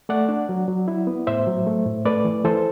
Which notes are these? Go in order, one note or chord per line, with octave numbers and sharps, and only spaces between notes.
A3 D5 F#5
D4
F#3
F#3
E4
B3
A2 C5 E5
F#3
A3
A2
A3 B4 D5
E3
E3 A4 C5